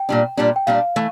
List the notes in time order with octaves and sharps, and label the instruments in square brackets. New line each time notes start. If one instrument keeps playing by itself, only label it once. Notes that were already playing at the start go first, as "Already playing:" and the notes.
Already playing: [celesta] G5
[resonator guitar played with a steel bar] A#2 G3 D4
A#2 G3 D4
[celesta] G5
[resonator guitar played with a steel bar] A#2 G3 D4 [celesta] F5
[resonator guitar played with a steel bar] E3 A3